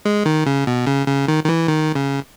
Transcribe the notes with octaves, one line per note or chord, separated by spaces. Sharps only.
G#3
D#3
C#3
B2
C#3
C#3
D#3
D#3
E3
D#3
C#3